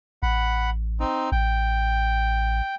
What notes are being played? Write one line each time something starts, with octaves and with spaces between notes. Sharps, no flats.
A1 F#5 B5
C4 D#4
A1 G5